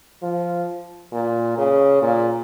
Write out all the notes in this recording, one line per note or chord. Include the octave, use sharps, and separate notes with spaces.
F3
A#2
C#3
A#2